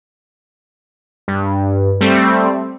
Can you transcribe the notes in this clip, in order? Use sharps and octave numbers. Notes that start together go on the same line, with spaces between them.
G2
G3 A3 C4